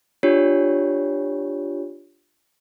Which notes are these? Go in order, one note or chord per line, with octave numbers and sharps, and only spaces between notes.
D4 F4 G4 C#5